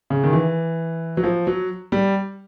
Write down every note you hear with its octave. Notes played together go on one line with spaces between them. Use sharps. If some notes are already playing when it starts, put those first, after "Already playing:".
C#3
D#3
E3
F#3
F3
F#3
G3